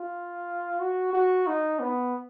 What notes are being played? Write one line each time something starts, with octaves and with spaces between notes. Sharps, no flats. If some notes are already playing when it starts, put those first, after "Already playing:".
Already playing: F4
F#4
F#4
D#4
B3